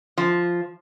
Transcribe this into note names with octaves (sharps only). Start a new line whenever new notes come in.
F3